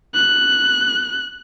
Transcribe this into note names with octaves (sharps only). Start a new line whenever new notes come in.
F#6